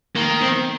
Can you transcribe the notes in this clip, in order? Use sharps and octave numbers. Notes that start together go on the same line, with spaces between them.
D#3 A#3
C4